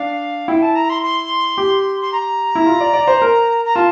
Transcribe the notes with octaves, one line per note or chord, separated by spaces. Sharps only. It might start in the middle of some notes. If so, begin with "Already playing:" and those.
Already playing: D4 F5
E4 G5
A5
A#5
C6
C6
G4
C6
A#5
E4
F4
D5
D5
C5
A#4
A#5
F4 A5